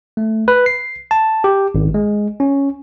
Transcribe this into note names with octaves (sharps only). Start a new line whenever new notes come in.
A3
B4
C7
A5
G4
G#1
G#3
C#4